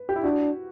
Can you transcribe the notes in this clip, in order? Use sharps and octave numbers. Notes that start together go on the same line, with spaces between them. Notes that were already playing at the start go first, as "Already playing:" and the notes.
Already playing: B4
G4
E4
D4 F#4